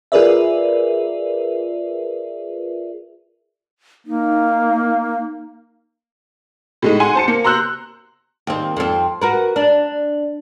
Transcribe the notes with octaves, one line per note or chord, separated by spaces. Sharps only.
F4 G#4 A#4 B4 D5 E5
A#3 D#4
A2 G#3 D#4
F#5 G#5 C6
C5 A5 C#7
A#3
A#5 C6 E6 F#6 G6
D#2 C4
F2 C4
F#4 A#4 B4
D4